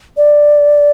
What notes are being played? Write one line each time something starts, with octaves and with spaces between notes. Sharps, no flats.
D5